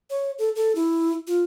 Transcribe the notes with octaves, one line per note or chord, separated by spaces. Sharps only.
C#5
A4
A4
E4
F4